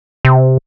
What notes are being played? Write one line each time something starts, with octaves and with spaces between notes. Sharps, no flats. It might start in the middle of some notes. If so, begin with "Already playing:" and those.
C3